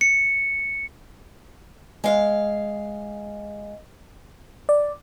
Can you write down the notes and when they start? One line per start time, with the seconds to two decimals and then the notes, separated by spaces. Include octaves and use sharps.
0.01 C#7
2.04 G#3 F5
4.69 D5